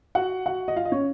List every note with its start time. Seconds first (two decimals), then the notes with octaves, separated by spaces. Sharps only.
0.15 F#4 F#5
0.46 F#4 F#5
0.68 D#5
0.76 F4 F5
0.85 D#5
0.92 C#4 C#5